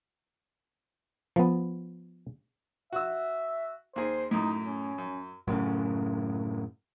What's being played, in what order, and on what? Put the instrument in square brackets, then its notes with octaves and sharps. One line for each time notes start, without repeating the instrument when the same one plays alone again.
[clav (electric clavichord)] F3 B3
[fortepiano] F#4 E6 [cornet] E5
[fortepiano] D#2 G#4 [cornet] C5
[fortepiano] F#2 A2 [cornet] D#4
[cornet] C#4
[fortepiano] F#2
[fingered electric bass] F#2 A2 C#3